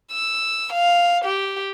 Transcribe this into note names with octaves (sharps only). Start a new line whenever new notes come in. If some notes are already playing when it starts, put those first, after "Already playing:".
E6
F5
G4